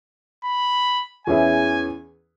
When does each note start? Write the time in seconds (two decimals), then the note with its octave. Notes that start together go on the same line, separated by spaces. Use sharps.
0.44 B5
1.27 E2 E3 C#4 E4 G#4 G#5